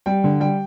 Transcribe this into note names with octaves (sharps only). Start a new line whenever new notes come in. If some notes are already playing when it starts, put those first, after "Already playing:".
G3 G5
D3
G3 G5